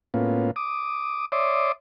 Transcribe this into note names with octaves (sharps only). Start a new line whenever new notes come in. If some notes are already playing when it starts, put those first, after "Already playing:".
A2 A#3 B3 C#4 F4
D6 D#6
C#5 D5 E5 C6 D6 D#6